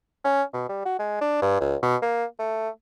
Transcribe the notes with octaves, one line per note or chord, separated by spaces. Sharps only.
C#4
B2
G3
F#4
G#3
D4
G2
C#2
B2
A#3
A3